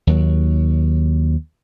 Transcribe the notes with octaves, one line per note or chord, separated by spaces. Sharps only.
D#2 F#3